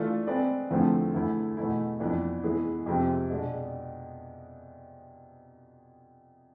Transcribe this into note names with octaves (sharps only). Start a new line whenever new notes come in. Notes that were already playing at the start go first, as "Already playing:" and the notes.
Already playing: E3 A3 D4 F4 A4
G#3 C4 G#4 B4 D5
E2 D3 F3 A3 C4
E2 D3 A3 E4
E2 B2 A3 E4
F2 E3 B3 D4
E3 G#3 B3 E4 G#4
F2 C3 G#3 C4
B2 G#3 D4